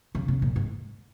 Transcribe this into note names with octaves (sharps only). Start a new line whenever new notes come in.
C#3
C#3
A#2
G#2